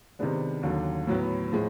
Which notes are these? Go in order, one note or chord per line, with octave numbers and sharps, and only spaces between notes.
C3 D#3 G#3 B3 D4
D#2 D3 F#3
A2 F#3 B3
A2 F3 G#3